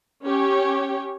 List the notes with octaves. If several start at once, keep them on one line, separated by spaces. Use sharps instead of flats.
C#4 G4 C#5